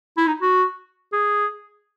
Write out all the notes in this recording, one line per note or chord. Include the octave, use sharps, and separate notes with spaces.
E4
D#4
F#4
G#4